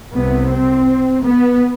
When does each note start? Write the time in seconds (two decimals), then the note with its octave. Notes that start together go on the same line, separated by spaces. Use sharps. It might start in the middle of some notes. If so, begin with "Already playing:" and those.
0.14 C2 C3 B3
0.51 C4
1.24 B3